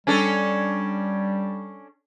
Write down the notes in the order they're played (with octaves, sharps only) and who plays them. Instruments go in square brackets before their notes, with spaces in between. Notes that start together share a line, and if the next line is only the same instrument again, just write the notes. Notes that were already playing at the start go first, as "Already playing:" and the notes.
[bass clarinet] G3 [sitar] C#4 D4 A4